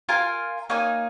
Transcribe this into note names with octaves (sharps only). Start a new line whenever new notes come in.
F4 A#4 F5 G#5
A#3 D#4 C#5 G#5